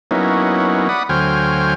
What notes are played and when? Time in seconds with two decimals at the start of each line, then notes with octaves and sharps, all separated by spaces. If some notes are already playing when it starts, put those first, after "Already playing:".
0.11 F#3 A#3 B3 C#4 D#4 E4
0.89 D5 F#5 B5 D#6
1.09 D2 F#3 C5 G5 G#5 F6